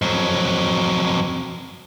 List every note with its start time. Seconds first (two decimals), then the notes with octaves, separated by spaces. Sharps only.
0.02 F2 F#3